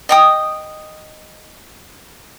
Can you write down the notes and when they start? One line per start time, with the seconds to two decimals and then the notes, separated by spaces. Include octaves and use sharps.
0.09 D#5 G5 D#6